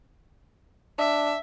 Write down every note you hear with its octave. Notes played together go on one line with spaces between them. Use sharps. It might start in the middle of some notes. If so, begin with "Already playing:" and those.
D4 E5